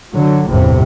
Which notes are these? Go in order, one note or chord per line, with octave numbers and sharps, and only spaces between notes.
D3 F#3
G1 E2 A2 C3